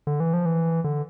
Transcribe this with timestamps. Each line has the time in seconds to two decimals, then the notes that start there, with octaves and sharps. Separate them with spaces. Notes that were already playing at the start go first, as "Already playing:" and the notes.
0.07 D3
0.20 E3
0.33 F3
0.46 E3
0.84 D3